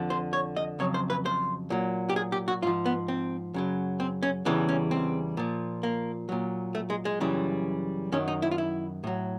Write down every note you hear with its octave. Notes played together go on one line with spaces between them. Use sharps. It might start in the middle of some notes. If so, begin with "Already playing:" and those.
Already playing: F2 D3 F3
C5
C#5
D#5
F2 C#3 F#3 C#5
C5
B4
C5
A#2 F#3
G4
G#4
G4
F#4
G#2 F3 F4
B3
C4
F#2 C#3 F#3
C4
C#4
E2 C#3 E3 G3 D4
C#4
C4
A#2 F3
A#3
A#2 F#3
A3
G#3
G#3
F#2 C#3 E3 G3
F#2 D#3 F#3 C#4
D#4
E4
F4
E4
A2 F#3